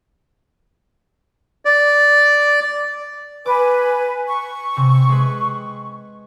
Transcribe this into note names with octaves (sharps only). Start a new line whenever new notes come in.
D5
B4 G#5 D6
C#6
C3
G#3 B4